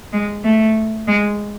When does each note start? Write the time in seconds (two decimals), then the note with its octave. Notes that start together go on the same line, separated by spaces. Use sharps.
0.12 G#3
0.44 A3
1.07 G#3